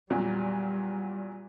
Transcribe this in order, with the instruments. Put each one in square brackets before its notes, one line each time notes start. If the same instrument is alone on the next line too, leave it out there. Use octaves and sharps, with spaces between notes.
[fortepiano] E2 A#2 F#3 [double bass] G3